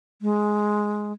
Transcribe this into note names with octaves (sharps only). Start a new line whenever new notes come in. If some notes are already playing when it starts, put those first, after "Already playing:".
G#3